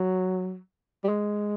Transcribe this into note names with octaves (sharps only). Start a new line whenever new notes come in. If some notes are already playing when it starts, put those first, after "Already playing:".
Already playing: F#3
G3
G#3